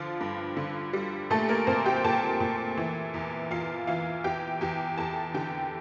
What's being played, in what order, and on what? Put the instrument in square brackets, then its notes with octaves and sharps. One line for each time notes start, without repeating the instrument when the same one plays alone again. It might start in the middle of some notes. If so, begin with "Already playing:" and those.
Already playing: [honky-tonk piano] D3 F3 F4
G2
D3
G3
A#2 A3 A4
A#3 A#4
A#2 C4 C5
G4 G5
A#2 A4 A5
A#2
E3
E2
E2 F4 F5
E3 F4 F5
E2 G4 G5
E2 G4 G5
E2 A4 A5
D3 G4 G5